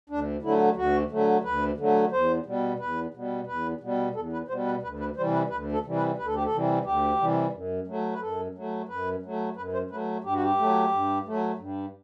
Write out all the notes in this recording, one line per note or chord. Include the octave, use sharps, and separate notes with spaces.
D2 D4
D3 F#3 A3 E4
D2 F#4
D3 F#3 A3
D2 B4
D3 F#3 A3
E2 C5
B2 G3
E2 B4
B2 G3
E2 B4
B2 G3
E2 A4
B4
B2 G3 C5
B4
D2 B4
B4
C3 E3 G3 C5
B4
D2 B4
A4
C3 E3 G3
B4
D2 B4
A4
G4
A4
C3 E3 G3
D2 G4
C3 E3 G3
F#2
F#3 A3
B4
F#2 A4
F#3 A3
F#2 B4
F#3 A3
F#2 B4
C5
F#3 A3 B4
G2 G4
F#4
G4
F#3 A3
G2
F#3 A3
G2